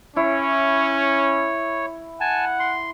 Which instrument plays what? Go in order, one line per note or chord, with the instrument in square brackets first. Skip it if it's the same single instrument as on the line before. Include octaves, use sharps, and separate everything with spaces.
[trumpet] C#4 [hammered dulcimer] E4 [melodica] C#5
[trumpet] F#5 [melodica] G#5 A5
[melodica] C6